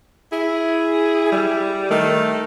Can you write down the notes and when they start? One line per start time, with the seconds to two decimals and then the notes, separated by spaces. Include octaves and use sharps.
0.32 E4 G#4
1.32 G3
1.91 D#3 A3